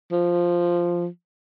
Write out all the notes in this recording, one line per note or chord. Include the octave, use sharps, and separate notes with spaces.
F3